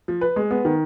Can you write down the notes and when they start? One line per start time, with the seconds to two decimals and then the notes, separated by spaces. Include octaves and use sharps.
0.08 F3
0.21 B4
0.36 G#3
0.51 B3
0.65 D#3